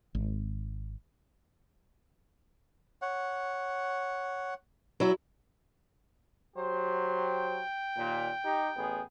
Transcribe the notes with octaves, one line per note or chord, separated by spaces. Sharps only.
G#1
C#5 F#5
F#3 E4
F#3 G4 C5
G5
D#2 A#2
D#4 G4
A1 B3 G#4